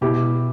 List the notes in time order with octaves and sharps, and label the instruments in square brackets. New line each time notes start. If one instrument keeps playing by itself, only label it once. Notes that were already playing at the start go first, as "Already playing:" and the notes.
[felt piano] B2 E4 G4